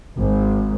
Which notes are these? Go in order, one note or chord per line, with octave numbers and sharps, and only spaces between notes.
G#1